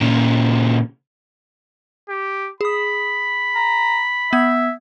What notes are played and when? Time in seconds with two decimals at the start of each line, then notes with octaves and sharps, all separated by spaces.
0.02 A#2 C#3
2.09 G4
2.61 G#4 B5 D#6
3.55 A#5
4.33 B3 E5 G#6